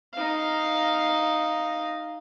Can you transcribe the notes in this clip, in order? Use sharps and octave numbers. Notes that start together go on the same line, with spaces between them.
D#4 F5